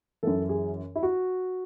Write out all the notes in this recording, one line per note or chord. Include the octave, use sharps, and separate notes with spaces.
F#2 E3 A4
G#4
E4
F#4